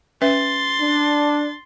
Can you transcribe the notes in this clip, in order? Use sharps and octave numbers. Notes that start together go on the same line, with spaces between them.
C#4 B4 E5 C6 A6
D4